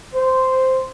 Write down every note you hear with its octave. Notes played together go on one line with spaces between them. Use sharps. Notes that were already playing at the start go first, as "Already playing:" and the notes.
C5